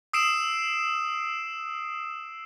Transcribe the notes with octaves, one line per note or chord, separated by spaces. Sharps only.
D#6 E6 C7 D7 E7